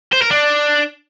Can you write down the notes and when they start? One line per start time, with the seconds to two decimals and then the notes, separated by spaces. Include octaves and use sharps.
0.13 C5
0.22 A#4
0.31 D4